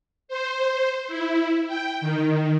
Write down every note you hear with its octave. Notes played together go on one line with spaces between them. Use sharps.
C5
E4
G5
D#3